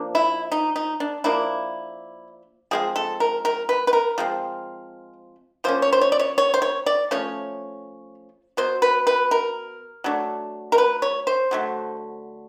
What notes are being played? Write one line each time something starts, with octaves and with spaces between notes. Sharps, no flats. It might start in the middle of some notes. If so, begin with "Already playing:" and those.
Already playing: F3 A#3 D4
E4
D#4
D#4
D4
F3 A#3 D4 E4
F3 G#3 C4 G#4
A4
A#4
A#4
B4
B4
A#4
F3 G#3 C4
F3 A#3 C#4 C5
C#5
C5
C#5
D5
C#5
C#5
C5
C#5
D5
F3 A3 C#4 C#5
B2 F#3 C5
B4
B4
A#4
F#3 A3 D4
A#4
B4
C#5
C5
D3 F#3 A3